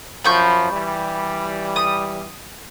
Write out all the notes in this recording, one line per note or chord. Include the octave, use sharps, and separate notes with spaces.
F#2 F3 B5 C#6 G6
E3 G3
D#6